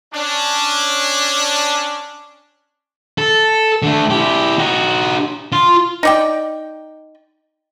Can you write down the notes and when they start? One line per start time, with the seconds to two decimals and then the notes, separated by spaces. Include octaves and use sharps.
0.14 C#4 D4
3.18 A4
3.83 D3 A3
4.10 E4 G4
4.58 D#4 F#4
5.52 F4
6.03 D#4 D5 G5